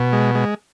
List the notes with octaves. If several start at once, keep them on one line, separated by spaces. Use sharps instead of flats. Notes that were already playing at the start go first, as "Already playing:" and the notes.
Already playing: B2
G#3
G#3